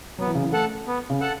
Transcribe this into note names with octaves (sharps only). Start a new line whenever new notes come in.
F#3 B3
E3
C#3
E3
A3 A4 F#5 A5
B3
C#3
A4 F#5 A5